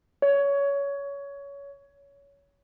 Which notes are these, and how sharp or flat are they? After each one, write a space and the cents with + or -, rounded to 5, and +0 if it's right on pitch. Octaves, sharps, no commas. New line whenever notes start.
C#5 +20